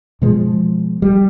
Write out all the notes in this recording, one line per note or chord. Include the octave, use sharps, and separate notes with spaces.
B2 F3 G#3
G3